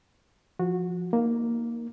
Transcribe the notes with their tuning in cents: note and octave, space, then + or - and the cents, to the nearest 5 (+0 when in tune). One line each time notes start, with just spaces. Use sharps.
F3 +0 F#4 -20
A#3 +5 D#4 +0